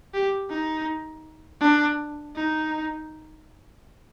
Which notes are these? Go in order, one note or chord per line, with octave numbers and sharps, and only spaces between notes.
G4
D#4
D4
D#4